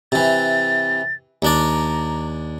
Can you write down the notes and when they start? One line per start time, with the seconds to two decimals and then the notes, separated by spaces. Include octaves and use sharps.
0.12 C3 E3 A6
1.42 D#2 D4 D5 A#5